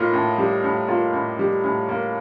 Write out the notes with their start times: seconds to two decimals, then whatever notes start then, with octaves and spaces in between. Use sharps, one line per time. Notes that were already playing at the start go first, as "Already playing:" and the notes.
Already playing: A2 A#3 D#4 F4
0.13 A2
0.38 G3
0.64 A2
0.88 A#3 F4
1.13 A2
1.39 G3
1.64 A2
1.89 A#3